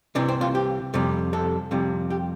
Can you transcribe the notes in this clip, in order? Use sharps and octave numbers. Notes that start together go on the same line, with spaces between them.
C2 C3 E3 D4
C4
F4
G4
F2 C3 G3
A4
F2 C3 G3
G4